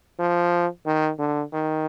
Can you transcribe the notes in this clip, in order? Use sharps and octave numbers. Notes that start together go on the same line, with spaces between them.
F3
D#3
D3
D#3